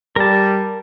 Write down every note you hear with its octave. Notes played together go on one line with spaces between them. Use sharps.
G3 A#4 A5